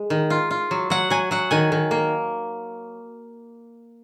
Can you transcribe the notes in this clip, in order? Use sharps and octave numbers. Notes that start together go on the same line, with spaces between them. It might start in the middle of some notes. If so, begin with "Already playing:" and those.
Already playing: G#3
D#3
F4
F4
F#3
F#3 F#5
F#3 G#5
F#3 F#5
D#3 G#5
D#3
A#3